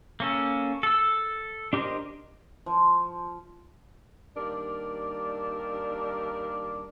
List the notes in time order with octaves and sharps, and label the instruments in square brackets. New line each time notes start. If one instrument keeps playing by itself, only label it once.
[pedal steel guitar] A#3 C#4 A4
A4 E6
D4 G4 A#4 C5 D#5
[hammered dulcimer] F3
[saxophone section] D#2 G3 D4 A#4 D5